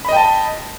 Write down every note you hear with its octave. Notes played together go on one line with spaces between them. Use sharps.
D#5 G5 A5 B5